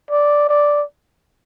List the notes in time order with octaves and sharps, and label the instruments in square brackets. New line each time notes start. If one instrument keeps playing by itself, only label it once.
[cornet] D5
D5